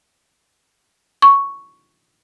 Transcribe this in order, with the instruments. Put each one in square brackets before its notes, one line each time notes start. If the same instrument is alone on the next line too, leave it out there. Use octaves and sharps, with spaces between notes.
[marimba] C#6